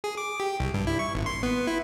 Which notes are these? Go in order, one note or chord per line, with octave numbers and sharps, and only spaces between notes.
G#4
D6
G4
C2
G2
E4
C#6
G#1
C6
B3
E4